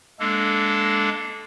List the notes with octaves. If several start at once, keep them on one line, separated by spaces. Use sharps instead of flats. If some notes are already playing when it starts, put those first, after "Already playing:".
G#3 A#3 D4 A4